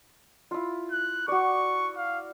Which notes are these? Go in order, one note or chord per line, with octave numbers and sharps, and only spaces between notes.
E4 F4
F#6
F#4 D5 C#6
F5